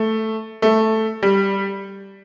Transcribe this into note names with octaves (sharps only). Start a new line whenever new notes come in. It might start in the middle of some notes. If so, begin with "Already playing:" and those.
Already playing: A3
A3
G3